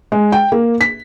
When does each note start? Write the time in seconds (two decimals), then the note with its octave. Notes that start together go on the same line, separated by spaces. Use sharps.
0.12 G#3
0.32 G5
0.52 A#3
0.81 B6